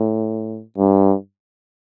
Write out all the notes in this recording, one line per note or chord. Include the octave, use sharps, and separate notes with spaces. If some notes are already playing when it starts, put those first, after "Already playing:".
Already playing: A2
G2